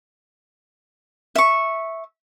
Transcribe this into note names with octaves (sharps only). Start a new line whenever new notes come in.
E5 C#6